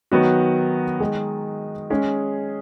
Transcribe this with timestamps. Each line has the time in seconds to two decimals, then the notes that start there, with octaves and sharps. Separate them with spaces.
0.12 D#3 F#3 B3 F#4
1.00 D#3 G#3 D#4
1.90 G#3 C#4 G#4